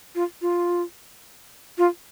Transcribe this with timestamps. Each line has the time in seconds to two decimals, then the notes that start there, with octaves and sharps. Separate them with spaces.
0.15 F4
0.42 F4
1.78 F4